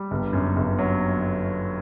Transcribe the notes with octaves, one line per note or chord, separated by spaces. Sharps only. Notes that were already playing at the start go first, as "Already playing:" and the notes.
Already playing: G3
G1
F#2
G1
F#3